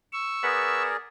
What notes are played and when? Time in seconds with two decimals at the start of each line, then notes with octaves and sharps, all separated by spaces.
0.12 C#6 E6
0.43 B3 G#4 A#4 D5